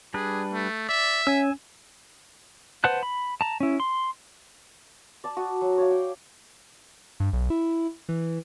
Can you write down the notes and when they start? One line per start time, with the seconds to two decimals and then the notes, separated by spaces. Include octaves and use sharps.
0.14 G3 D4 G#4 B4
0.53 A3
0.89 D5 E5
1.27 C#4 G#5 E6
2.84 B4 C5 F#5 A5 F#6
3.03 B5
3.41 A5 A#5
3.60 C#4 E4
3.80 C6
5.24 D5 A5
5.37 F#4 D#6
5.61 F#3
5.78 C#5 D5 F5
5.91 G5
7.20 G2
7.33 B1
7.50 E4
8.09 E3